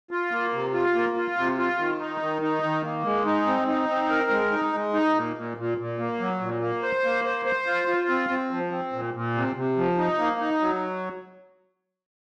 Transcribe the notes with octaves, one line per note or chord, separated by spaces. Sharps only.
F4
A#3
C3
F4
A#3
F4
C3
F4
D#3
D#4
D#3
D#4
D#3
A#3
G#3
D#4
C4
D#4
C4
A#4
G#3
D#4
G#3
D#4
A#2
A#2
A#2
A#2
A#3
F#3
A#2
A#3
C5
A#3
C5
C5
F4
F4
C4
C4
F3
C4
A#2
A#2
C3
C3
F3
D#4
A#3
D#4
F#3